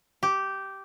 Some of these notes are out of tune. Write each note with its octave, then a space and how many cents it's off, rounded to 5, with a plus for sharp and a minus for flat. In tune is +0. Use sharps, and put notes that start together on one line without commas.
G4 -10